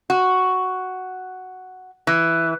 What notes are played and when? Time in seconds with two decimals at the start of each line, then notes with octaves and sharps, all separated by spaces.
0.10 F#4
2.07 E3